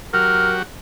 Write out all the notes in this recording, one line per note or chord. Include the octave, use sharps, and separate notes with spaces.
F#3 F#4 G4 A#4